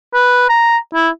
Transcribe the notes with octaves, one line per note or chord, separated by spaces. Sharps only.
B4
A#5
E4